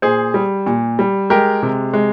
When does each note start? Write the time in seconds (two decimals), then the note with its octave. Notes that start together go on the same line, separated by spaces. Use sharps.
0.02 A#2 G#4 C5
0.34 G3
0.66 A#2
0.99 G3
1.30 G#3 G4 A#4
1.62 C3
1.94 G#3